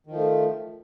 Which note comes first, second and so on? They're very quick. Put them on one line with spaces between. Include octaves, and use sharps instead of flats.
D#3 F3 A3